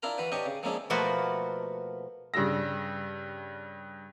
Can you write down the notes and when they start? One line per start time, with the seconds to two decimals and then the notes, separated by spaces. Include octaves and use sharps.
0.03 D4 E4 F4 A#4 A#5
0.18 E3 F#4 B4
0.32 D4 G4 C#5 D#5 C#6
0.46 C#3
0.63 F3 G#3 A#3 C#4 D4 E4
0.90 B2 F3 A3 A#3 F#4 B4
2.34 G2 C#3 D4 E6 A#6